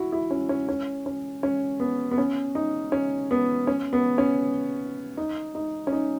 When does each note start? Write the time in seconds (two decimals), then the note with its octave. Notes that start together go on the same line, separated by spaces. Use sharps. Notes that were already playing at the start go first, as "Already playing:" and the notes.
Already playing: E4 F#4
0.12 E4
0.31 C#4
0.49 C#4
0.69 C#4
1.06 C#4
1.43 C#4
1.80 B3
2.11 B3
2.18 C#4
2.55 D#4
2.92 C#4
3.31 B3
3.67 C#4
3.93 B3
4.18 C#4
5.17 D#4
5.55 D#4
5.87 C#4
5.92 D#4